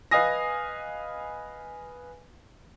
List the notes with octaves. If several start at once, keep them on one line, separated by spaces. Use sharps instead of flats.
B4 D#5 F5 G#5 D#6 A#6